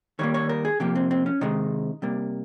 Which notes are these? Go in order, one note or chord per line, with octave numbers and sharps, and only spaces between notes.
D#3 G3 A#3 C#5
C#5
A#4
G#4
C3 F3 A#3 G4
C4
C4
C#4
C3 D#3 G#3 D#4
C3 G3 A#3